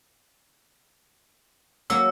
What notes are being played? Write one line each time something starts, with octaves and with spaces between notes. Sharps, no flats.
F#3 A#3 E6